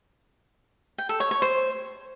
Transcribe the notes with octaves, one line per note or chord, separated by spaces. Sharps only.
G5
A4
C#5
C#5
C5